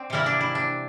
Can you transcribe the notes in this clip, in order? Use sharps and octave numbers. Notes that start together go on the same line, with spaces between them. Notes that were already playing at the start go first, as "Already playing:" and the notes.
Already playing: C4 D4
C3 E3 G3 A#3 E4
D4
E4
D4